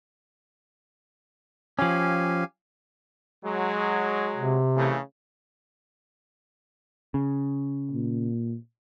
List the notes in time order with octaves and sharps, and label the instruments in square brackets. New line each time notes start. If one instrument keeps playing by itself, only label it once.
[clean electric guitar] F3 C#4 [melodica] G4 F5 G#5
[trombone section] F#3 G#3
[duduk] C3
[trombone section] C#3 E3 A3
[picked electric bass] C#3
[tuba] A#2